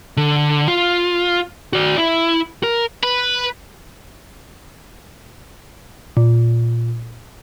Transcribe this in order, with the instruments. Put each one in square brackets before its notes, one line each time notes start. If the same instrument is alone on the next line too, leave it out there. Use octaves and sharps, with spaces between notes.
[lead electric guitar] D3
F4
F#4 D5
E4
A#4
[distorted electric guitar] B4
[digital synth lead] A#2